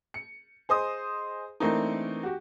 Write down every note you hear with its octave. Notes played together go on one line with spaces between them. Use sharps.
C#7
G#4 C5 D#5 D#6
E3 A3 A#3 C4 D4 D#4
F#4 G4